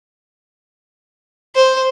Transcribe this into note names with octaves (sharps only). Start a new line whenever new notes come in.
C5